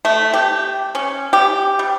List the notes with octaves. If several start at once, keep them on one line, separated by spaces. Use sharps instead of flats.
A3
G4
C#4
G4
G3